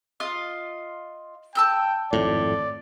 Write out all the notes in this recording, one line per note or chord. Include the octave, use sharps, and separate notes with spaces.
F4 D#5 F5
G5 A5 E6 G6
G#1 F2 A2 D5